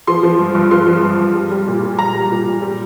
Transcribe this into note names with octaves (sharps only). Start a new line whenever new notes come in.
F3 C6
F3
G2
G2
F3 C6
F3
G2
G2
G3
G3
A#2
A#2
G3 A#5
G3
A#2
A#2
G3